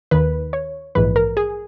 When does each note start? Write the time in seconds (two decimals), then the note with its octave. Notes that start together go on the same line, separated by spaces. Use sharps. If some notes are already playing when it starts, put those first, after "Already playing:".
0.11 D#2 D#3 B4
0.53 C#5
0.95 A#1 G#2 E3 B4
1.16 A#4
1.37 G#4